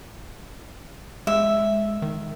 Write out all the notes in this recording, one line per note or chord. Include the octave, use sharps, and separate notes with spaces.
G#3 E5
D#3